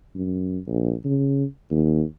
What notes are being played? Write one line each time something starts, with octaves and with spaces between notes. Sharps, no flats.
F#2
A#1
C#3
D#2